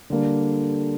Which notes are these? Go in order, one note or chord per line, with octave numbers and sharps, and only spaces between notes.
D3 G3 A#3 D4